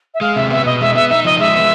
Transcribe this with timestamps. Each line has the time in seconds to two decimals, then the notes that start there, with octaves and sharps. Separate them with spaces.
0.14 E5
0.21 G#3 F5
0.36 C3 E5
0.51 B3 E5
0.66 B2 D#5
0.81 G#3 E5
0.95 B3 E5
1.10 D#4 E5
1.25 F3 D#5
1.40 G#3 E5
1.55 B3